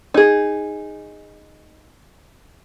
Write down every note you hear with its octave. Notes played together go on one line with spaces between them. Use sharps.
D#4 G#4